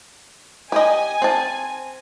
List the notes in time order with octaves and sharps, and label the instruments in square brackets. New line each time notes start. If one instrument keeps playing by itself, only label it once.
[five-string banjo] G4 D#5 [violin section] G#5
[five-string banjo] C4 A5